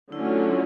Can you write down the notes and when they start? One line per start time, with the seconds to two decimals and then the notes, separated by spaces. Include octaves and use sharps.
0.12 D3 F#3 A3 C#4 E4
0.25 F4
0.40 E4